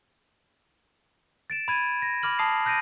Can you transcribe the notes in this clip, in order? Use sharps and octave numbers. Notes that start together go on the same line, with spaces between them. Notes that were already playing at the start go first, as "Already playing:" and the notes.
A6 D7 E7
B5 G#6 D#7
A#6
B5 D6 F6 F#7
A5 D#6 C7 F7
F#6 G6 A#6 D7 D#7